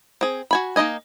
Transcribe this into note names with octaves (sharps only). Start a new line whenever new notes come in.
C4 G#4
F#4 G#5 B5
A#3 D#4 E4 D#5 G#5